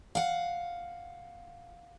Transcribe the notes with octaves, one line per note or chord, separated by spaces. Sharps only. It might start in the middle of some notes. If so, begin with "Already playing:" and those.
F5 F#5